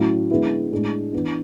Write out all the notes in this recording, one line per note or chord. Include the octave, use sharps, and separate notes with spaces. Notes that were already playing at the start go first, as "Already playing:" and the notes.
Already playing: A2 F#3 C#4 E4
D3 G#3 B3 E4
A2 G#3 D4
E3 B3 D4